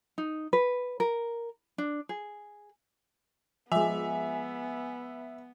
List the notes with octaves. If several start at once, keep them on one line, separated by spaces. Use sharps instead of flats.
D#4
B4
A#4
D4
G#4
F3 G#3 B3 E5 G#5